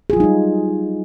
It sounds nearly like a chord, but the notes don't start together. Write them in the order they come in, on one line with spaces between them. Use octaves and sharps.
G#4 F4 F#3 D#4 G3